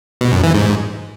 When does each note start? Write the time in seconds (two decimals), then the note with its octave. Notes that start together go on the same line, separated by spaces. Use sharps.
0.21 B2
0.32 F#2
0.43 E3
0.55 G#2